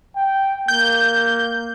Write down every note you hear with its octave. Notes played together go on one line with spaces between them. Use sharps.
G5
A#3 G6